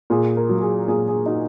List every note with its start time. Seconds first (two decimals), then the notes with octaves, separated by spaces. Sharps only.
0.10 A#2 G#4
0.37 A#4
0.49 F#3
0.62 G#4
0.88 A#2 G#4
1.08 G#4
1.26 D#4 F#4